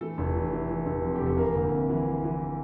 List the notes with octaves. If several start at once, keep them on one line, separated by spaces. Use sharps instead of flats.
E3 A3 A4
F1
E3
E3
E3
F1
F2
G4
F1
A4
E3 A#3 A#4
D2
C3
E3
E3
E3